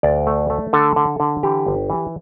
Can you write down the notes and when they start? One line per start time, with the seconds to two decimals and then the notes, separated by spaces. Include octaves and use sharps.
0.03 D2 D5
0.27 A3
0.50 A3
0.73 D3 A4
0.96 D3
1.20 D3
1.43 E3 G4
1.67 G1
1.90 E3